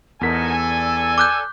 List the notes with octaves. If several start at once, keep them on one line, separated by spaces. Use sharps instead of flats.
E2 D#4 A4 A#4 F#5 G#5 B6
D5 E6
D6 F#6 G6